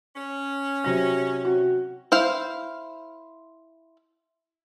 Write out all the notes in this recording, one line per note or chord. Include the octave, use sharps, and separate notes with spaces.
C#4
C3 F#3 A#6
F#4
E4 C5 F5